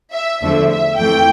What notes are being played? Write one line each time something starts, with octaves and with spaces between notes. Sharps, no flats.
E5
E2 D3 F3 A3 E5
E5
F2 E3 A3 G5